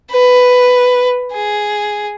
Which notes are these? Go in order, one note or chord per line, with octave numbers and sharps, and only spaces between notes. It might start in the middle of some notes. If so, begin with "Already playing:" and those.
B4
G#4